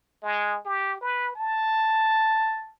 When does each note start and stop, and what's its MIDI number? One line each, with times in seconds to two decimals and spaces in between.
0.23 0.58 56
0.65 1.00 67
1.01 1.32 71
1.35 2.72 81